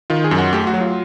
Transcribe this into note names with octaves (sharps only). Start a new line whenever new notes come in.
D#3 F4
G#4
F#2
F#4
A3 G4
F#4
F#3
F4